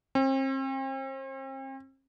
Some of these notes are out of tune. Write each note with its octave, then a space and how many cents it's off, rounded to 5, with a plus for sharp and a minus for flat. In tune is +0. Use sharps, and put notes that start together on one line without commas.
C4 +40